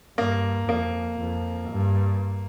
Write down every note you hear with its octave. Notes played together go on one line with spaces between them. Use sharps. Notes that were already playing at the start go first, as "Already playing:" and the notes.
G2 A#3
F2 A#3
F2
G2